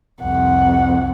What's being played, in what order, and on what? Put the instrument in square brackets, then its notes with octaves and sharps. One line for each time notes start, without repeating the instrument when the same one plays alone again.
[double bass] C2 F2 [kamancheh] F#5